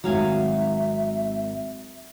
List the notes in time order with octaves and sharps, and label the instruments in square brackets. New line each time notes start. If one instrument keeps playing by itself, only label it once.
[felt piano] G#1 G#2 D#3 [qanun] F#3 F5 G#5 [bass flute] E5